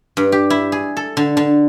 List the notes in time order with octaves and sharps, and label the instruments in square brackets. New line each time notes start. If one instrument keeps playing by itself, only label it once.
[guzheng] G2
G4
E4
G#4
A4
D3
D3